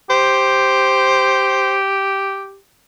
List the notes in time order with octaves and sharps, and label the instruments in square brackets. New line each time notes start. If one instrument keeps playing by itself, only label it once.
[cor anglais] G4 [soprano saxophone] C5